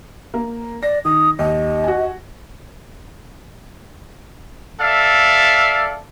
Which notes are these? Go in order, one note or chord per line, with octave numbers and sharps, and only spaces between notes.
A#3
D5 A#6
D#3 D#6
D#2 D#5
F#4 G#5
A4 D5 E5 F5